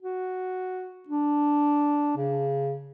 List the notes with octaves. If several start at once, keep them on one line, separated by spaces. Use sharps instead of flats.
F#4
D4
C#3